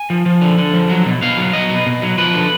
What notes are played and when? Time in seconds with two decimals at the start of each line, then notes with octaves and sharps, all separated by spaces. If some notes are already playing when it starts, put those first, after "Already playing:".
Already playing: G#5
0.10 F3
0.26 F3
0.42 D3
0.58 D3
0.73 F3
0.89 F#3
1.06 B2
1.22 B2 F5
1.37 F#3
1.53 F#3 D#5
1.70 B2
1.87 B2
2.02 F#3
2.18 F3 B4
2.34 D3